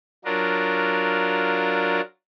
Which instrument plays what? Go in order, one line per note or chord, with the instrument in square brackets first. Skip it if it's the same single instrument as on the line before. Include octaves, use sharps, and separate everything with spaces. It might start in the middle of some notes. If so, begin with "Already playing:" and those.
[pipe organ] F#3 D4 F4 A#4